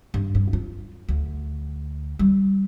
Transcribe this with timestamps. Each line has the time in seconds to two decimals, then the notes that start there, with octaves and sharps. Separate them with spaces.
0.14 G2
0.35 G2
0.53 F4
1.09 D2
2.19 G3